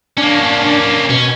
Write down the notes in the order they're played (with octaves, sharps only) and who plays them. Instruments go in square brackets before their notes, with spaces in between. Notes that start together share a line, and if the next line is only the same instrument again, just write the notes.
[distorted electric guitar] A#3 C#4 [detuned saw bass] D4
[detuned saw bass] B2 [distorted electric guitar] C#4